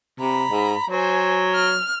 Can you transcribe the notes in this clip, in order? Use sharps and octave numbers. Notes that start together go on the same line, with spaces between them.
C3 A#5 B5
G#2
F#3 C5 G#5
F6